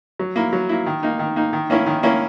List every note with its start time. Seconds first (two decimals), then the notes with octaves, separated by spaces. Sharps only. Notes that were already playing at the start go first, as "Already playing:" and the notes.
0.19 F#3
0.36 A#3 E4
0.53 F#3
0.69 A#3 E4
0.86 D#3
1.03 A#3 D#4
1.19 D#3
1.36 A#3 D#4
1.53 D#3
1.70 A#3 C#4 E4
1.86 D#3
2.03 A#3 C#4 E4